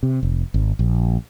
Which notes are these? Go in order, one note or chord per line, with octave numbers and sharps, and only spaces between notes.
C3
F1
G#1
A#1